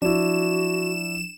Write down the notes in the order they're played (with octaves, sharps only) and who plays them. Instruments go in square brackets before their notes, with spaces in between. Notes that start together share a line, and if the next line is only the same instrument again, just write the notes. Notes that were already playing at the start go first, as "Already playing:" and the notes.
[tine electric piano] F3 [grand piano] D4 E4 [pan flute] F#4 [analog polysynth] E7